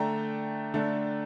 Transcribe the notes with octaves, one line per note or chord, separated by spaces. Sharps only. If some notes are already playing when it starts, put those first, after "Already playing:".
Already playing: D3 A3 D4 G5 A#5
D3 A3 D4